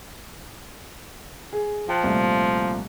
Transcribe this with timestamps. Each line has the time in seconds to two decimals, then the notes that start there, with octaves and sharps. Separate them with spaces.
1.53 G#4
1.89 F3 G5 A5 F#6
2.04 C2 A#2 A3